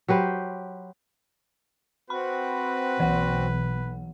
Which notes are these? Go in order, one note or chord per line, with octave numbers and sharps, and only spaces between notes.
F#3 G4 B4 C5
C4 F#4 B4 B5
B1 E3 F#5